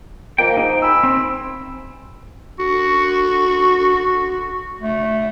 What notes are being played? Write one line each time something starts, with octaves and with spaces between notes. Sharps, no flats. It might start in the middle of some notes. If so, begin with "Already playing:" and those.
D#3 F3 A#3 G5
G#2 D#4
G#5 B5 E6
C4
F#4
A3